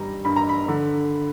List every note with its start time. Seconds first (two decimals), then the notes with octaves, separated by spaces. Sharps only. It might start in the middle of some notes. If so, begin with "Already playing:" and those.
Already playing: G2 G3 A#5
0.25 G2 B5
0.36 A#5
0.49 B5
0.68 D3